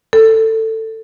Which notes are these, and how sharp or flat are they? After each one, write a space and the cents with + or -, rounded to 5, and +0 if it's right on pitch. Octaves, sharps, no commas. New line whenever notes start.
A4 +15